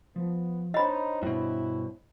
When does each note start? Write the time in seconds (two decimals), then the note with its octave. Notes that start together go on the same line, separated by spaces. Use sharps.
0.16 F3 B3
0.74 D4 D#4 C5 C#5 D#5 B5
1.23 G2 B2 E4